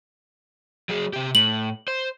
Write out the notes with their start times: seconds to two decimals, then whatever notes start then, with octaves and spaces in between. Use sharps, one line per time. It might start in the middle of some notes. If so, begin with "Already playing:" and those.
0.89 F#3 G#4
1.13 C3 G4
1.35 A2 F#7
1.88 C5